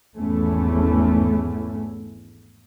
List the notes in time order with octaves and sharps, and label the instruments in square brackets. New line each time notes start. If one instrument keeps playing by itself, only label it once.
[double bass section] G#1 E2 A3 C#4